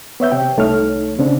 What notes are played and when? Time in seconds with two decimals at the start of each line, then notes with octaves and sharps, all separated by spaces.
0.20 B3 C#5 E5 G6
0.32 C3 G5
0.57 C2 A3 D#4 A4 C#5 F6
1.19 C#3 C4 D4